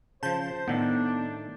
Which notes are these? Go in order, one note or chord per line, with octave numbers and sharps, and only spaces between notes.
C#3 F3 C5 A5 G6
A2 D#3 B3 D4 A4